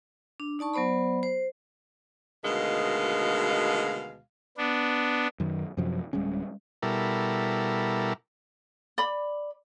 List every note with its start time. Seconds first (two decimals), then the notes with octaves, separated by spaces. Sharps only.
0.40 D4
0.59 D#4 D5 A5 C#6
0.73 F#3 B3 C5 D5 B5
1.23 C5
2.44 D2 B2 D#3 G#3 F5
4.57 B3 D4
5.40 F#2 D#3
5.77 F#2 C3 F3 F#3
6.13 D1 G3 G#3 C#4
6.83 B2 G3 E4 A4 A#4
8.98 D5 B5